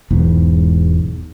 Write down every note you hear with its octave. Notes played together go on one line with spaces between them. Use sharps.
E1 B1 E2 G#2